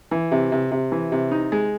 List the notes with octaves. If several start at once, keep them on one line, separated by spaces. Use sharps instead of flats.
E3
C3
C3
C3
E3
C3
D#4
G#3